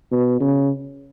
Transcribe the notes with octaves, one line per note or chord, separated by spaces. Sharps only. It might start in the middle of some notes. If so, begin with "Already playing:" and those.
B2
C#3